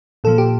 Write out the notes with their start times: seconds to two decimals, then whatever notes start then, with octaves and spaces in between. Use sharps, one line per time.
0.24 A#2 F3 A#3 A4
0.38 G4